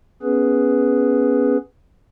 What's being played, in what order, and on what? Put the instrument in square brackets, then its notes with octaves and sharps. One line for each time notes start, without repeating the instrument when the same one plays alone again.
[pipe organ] B3 C#4 G#4 B4